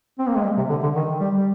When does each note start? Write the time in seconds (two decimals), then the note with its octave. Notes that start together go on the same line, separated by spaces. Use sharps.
0.19 C4
0.27 A#3
0.36 G#3
0.45 G3
0.57 C3
0.70 D3
0.83 D3
0.96 D#3
1.21 G3
1.37 G3